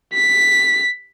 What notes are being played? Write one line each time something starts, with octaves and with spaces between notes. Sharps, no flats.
B6